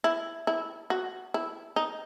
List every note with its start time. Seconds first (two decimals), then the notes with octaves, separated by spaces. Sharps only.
0.04 E4
0.47 E4
0.90 F#4
1.34 E4
1.76 D#4